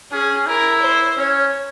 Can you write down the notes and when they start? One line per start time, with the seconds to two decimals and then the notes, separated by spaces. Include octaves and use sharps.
0.11 C#4 G#4
0.47 E4 A#4
0.82 C5
1.17 C#4 C#5